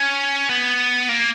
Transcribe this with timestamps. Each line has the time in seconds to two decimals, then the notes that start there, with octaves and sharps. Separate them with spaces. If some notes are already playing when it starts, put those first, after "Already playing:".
Already playing: C#4
0.49 B3
1.09 A#3